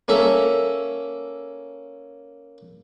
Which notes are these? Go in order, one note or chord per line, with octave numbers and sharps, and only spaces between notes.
A#3 C#4 A4 E5